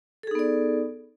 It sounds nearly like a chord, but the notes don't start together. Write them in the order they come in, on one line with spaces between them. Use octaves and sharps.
A4 G#4 D#4 B3 D5